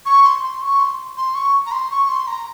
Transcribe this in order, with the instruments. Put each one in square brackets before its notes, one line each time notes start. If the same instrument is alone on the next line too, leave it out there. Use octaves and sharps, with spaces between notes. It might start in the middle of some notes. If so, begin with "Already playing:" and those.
[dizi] C#6
C6
C6
C#6
C6
C6
C#6
A#5
C6
C#6
C6
A#5